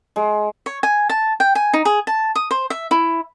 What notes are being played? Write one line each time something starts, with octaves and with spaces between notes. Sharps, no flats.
G#3
C#5
G#5
A5
G5
G#5
D#4
G#4
A5
D#6
C5
E5
E4